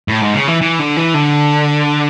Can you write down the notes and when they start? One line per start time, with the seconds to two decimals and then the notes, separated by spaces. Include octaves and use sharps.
0.08 A2
0.21 G#2
0.34 C#3
0.48 E3
0.62 E3
0.80 D3
0.97 E3
1.14 D3